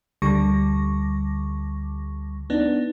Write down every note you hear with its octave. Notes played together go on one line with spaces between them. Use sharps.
D2 D3 G3 C#6 D6 A#6
B3 D4 D#4